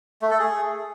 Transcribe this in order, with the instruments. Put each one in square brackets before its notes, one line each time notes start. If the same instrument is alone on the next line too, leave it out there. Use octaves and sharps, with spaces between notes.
[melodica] A3
A4
G#4